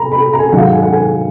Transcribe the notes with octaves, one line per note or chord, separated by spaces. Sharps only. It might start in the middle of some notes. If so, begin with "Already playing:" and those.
Already playing: A#5 B5
B5
A#5
G#5
G#2 D#3 F#3 F#5
F5
F#5
G#5
F#5
G#5